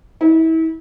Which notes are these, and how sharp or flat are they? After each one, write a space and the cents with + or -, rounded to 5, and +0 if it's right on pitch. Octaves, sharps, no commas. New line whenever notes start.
E4 -35